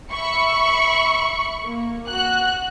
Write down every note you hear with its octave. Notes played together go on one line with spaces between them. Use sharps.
E5 B5 C#6 C#7
A#3
F#4 F#6